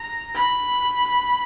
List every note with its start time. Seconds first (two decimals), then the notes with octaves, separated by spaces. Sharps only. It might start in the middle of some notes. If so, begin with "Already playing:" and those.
Already playing: A#5
0.34 B5